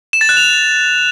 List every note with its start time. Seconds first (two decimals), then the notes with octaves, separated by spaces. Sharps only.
0.13 E7
0.21 A6
0.29 F#6
0.37 F7